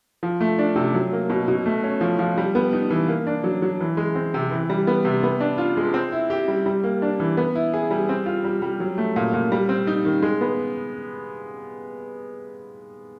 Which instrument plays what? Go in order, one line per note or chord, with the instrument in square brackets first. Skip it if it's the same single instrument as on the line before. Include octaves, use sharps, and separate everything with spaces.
[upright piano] F3
A3
D4
C3
F#3
A#3
B2
B2
A3
C#4
F3
F3
G3
B3
D#4
E3
A#3
D4
F#3
F#3
E3
G#3
C4
C3
E3
G3
B3
C3
B3
D4
F4
G#3
C4
E4
G4
G3
G3
A#3
D4
E3
B3
E4
G#4
G3
C4
F4
G3
G3
F#3
A3
A#2
A#2
G3
C4
D#4
D#3
G#3
B3